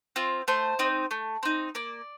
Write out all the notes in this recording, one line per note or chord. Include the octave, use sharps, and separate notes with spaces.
C4 F4
A3 C5
C4 D#4
A3
C4 D#4
A#3 D5